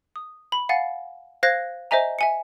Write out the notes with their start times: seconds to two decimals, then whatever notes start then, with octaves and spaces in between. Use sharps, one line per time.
0.16 D#6
0.52 B5
0.69 F5 F#5 G#5 A6
1.43 C5 F5 F#6 G#6 A#6
1.91 C5 D#5 E5 G#5 A#5
2.19 E5 G#5 C#7